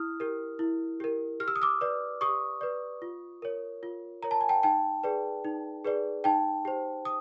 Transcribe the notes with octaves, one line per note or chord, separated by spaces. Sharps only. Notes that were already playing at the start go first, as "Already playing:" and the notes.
Already playing: E4 D#6 F6
G4 A#4
E4
G4 A#4
G4 F6
E6
D#6
D6 E6
B4 D5
G4 C#6 D#6
B4 D5
F4
A#4 C#5
F4
A#4 C#5 A#5
A5
G#5
G5 A5
D#4 G5 A5
G#4 B4 D5
D#4
G#4 B4 D5
D#4 G5 A5
G4 C5
D#6